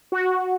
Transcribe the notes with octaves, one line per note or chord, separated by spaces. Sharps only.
F#4